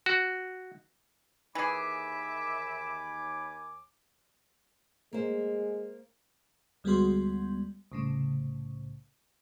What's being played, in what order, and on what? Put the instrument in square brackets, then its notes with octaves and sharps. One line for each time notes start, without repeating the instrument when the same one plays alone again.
[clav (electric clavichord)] F#4
[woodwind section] D#2 G#5 D6 [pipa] E3 G#4 [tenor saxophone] E5 [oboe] B5
[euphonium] G#3 [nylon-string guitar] A#3 C5
[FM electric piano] D2 G3 G#3 B3 F#4 C6
C2 A2 C#3